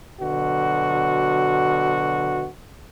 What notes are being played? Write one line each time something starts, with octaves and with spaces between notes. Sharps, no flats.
B2 D3 F#3 F#4